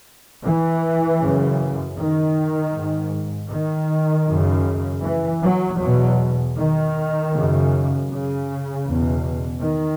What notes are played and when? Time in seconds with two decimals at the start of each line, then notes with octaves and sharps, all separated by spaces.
0.45 E3
1.21 F#2 C#3
1.98 D#3
2.74 G#2
3.51 D#3
4.27 F#2 C#3
5.03 E3
5.43 F#3
5.80 E2 B2 F#3
6.57 D#3
7.33 F#2 C#3
8.10 C#3
8.87 E2 B2
9.63 D#3